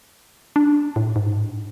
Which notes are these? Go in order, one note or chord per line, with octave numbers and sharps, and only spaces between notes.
D4
A2
G#2